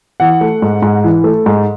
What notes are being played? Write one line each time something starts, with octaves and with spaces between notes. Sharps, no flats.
E3 F#5
A3
G#2
G#2
E3
A3
G#2